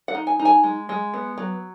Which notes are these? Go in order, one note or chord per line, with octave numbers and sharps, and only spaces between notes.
F#5
D#4
G#5
D#4
G#5
G#3
G#3
B3
F#3